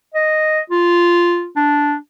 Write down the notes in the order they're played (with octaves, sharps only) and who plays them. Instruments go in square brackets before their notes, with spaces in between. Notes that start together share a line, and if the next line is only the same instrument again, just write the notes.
[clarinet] D#5
F4
D4